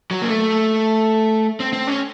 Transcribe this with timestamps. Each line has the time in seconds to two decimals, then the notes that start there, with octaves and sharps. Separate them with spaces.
0.11 F#3
0.22 A#3
0.28 A3
1.60 C4
1.73 C4
1.87 C#4